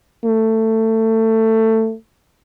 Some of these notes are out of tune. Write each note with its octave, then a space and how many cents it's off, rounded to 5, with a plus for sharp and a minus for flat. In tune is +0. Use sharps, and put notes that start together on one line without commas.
A3 +20